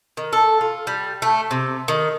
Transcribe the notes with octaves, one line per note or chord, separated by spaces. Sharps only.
D#3
A4
F4
G3
A3
C3
D#3